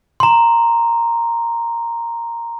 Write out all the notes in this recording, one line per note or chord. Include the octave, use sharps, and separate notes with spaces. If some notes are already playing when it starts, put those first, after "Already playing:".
A#5 C6